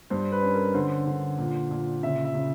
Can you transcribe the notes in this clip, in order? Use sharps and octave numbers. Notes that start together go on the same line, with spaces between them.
G2 C5
B4
C#4
A#4
D3 C5
D3
A#2
A#2
C#3 E5
E5
C#3